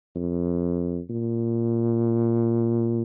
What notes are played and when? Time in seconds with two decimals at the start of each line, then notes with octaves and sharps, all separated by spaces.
0.15 F2
1.10 A#2